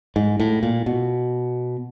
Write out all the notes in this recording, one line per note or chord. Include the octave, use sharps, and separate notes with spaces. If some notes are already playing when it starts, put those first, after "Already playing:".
G#2
A2
A#2
B2